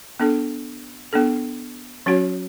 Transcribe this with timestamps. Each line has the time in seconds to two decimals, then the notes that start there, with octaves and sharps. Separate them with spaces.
0.20 B3 D4 A4
1.13 B3 D4 A4
2.06 F#3 C#4 F#4 C#5